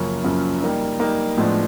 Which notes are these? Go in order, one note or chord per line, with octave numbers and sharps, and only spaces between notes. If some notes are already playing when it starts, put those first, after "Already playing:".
Already playing: F#2 C#3 F3 A#3 C#4
F#2 C#3 F3 A#3 C#4
G3 A#3 D#4
G3 A#3 D#4
A2 F3 G#3 B3 D4